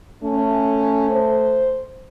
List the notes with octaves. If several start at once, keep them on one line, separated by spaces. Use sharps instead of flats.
A3 C#4
C5